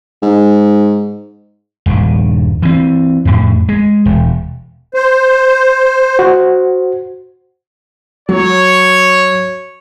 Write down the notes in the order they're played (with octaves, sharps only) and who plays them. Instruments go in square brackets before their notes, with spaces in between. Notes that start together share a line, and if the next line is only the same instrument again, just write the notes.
[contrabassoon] G#2
[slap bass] D#1 G2
E3 C4
F2 A2
G#3
E1
[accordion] C5
[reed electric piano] F#4 C5
[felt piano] F#3 [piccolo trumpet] C#5